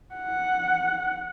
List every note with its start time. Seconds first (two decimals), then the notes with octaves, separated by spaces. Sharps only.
0.15 F#5